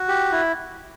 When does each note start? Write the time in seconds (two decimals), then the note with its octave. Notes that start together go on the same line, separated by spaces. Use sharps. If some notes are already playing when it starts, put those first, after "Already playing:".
Already playing: F#4
0.08 G4
0.32 E4